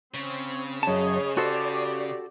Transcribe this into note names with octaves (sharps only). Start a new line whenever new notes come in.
C#3 C4
F#2 G#4 C#5 D#5 A5
F#4 G4 A4 C5 D5